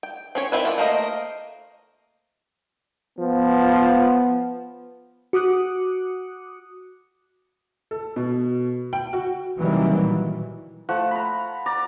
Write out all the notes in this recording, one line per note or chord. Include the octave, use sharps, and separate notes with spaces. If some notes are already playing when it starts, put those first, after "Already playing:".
G5
C4 C#4 C#5
D#3 C4 E4 B4
F4 F#4 D5
A3 A#3 A#4 C5 D#5
F3 B3
F#4 D6 D#6 F#6
A4
B2
G5
F#4
C3 D#3 E3 F#3 G3 A#3
A#2
F3 A3 F#5
A#5 B5
D5 A#5